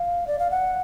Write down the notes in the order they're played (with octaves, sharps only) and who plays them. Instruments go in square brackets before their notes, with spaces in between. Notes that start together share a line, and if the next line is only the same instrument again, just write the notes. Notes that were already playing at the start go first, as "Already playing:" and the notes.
Already playing: [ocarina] F5
D5
F5
F#5